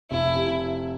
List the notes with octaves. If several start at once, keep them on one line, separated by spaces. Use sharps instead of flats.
F1 E4
C3